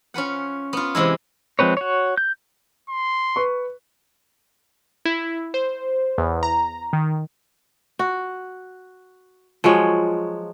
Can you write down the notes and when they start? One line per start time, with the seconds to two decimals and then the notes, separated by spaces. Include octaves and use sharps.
0.14 C#4 F4 B4 F#5
0.73 B3 F4
0.95 C3 E3 G#3 E4
1.59 F3 G#3 C4 B4 C#5
1.77 F#4 C#5
2.17 G6
2.89 C6
3.36 B4 C#6
5.05 E4
5.54 C5
6.18 E2
6.43 A#5
6.93 D#3
7.99 F#4
9.64 F3 F#3 G#3 C#5